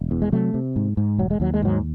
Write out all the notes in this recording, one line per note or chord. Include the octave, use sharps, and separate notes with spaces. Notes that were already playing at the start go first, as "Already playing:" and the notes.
Already playing: E1
E2
G#3
C3 F#3 A3
C3
G#2
G#2
E1 F#3
G#3
D#2 F#3
G#3
G#2 D#3 F#3